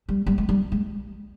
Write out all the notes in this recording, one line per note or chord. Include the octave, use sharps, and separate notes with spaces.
G3
G3
G#3
G3
G#3